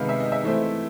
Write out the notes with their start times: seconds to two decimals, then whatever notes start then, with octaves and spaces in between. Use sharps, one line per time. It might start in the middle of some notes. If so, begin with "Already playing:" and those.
Already playing: C3 D#3 G#3 B3 D#4 F5
0.09 E5
0.20 D#5
0.32 E5
0.43 E3 A3 C4